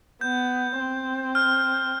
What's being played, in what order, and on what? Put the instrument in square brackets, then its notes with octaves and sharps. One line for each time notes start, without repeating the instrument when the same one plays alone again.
[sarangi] B3 [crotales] G6
[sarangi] C4
[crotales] F6